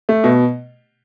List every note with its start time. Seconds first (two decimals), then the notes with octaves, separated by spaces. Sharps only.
0.09 A3
0.24 B2